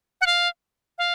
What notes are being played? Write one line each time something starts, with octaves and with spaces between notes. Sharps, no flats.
F#5
F5
F5